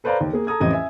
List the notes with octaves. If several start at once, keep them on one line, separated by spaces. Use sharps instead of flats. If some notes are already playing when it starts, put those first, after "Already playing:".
A4 B4 C5 D5 F5 A#5
D#2
A#3 G#4
A4 A#5 D#6 G#6
A1 F2 G4 D#5 G#6 D#7
E5 G#5